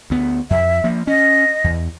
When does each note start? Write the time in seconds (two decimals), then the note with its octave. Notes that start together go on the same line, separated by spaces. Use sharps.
0.10 D2 B3
0.50 F2 E5
0.84 F3 A#3
1.07 C#4 D#5
1.64 E2